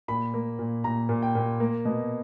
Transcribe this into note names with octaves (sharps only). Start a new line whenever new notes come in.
A#2 B5
A#3
A#2
A#2 A#5
A#2
G5
A#2
A#3
B2